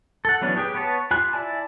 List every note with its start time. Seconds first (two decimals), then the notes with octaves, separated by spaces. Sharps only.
0.25 A4 F#5
0.41 E3 F#3 B3 C#4 D4
0.57 G4 G#4 B4 G5
0.74 B3 B4 C#5 A5
1.11 F4 G4 G#5 B5 F#6
1.33 E4 D5 G#5 A5